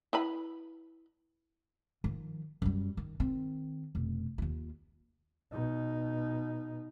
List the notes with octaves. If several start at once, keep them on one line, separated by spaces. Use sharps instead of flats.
E4 B4 B5
D#3 F3
F#2 G3
D#3
D#3 C4
F1 B2
D#2 F4
B2 D#4